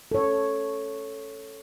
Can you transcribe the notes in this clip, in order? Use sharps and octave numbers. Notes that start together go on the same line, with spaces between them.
A4 C#5